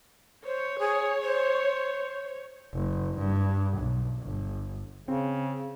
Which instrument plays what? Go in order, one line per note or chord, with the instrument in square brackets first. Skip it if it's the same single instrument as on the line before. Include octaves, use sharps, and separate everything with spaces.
[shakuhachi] C5 [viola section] C#5
[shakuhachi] G#4
C5
[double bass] F#1
G2
B1
G1
[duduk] C#3 [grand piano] C4